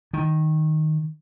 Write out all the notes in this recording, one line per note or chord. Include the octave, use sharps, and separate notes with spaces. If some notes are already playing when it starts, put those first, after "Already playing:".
D#3